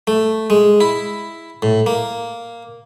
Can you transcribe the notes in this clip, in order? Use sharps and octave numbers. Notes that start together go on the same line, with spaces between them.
A3
G#3
E4
A2
A#3